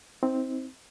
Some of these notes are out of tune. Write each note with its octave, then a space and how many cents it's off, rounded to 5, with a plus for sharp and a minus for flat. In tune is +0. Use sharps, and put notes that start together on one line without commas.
C4 +0 D#4 +35